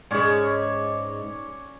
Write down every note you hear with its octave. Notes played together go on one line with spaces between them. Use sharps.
G#2 G#3 C#4 C#5 D5